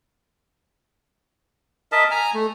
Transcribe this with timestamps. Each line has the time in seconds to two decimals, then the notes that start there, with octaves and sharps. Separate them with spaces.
1.92 A#4 D#5 E5 A5
2.11 G#5 A#5
2.34 A3